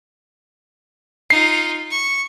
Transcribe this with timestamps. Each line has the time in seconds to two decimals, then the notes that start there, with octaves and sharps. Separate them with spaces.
1.30 D#4 F4 C7
1.91 C#6